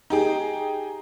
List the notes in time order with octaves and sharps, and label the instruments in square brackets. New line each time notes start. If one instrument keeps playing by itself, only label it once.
[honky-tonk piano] D#4 G4 G#4